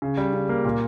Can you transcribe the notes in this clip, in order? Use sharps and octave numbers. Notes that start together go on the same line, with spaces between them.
C#3
G3
C#3
A#3
A#2